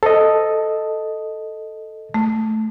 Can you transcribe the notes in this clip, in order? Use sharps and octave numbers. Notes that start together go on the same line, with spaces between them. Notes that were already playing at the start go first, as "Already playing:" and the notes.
A4 C5 D#5
A3